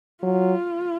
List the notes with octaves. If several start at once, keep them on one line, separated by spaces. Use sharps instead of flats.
F#3 F4